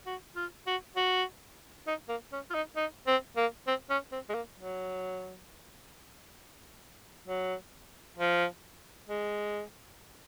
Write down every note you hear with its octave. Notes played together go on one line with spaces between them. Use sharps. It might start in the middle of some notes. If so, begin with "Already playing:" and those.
F#4
F4
F#4
F#4
D#4
A#3
C#4
F4
D#4
D#4
C4
A#3
C4
C#4
C4
G#3
A#3
F#3
F#3
F3
G#3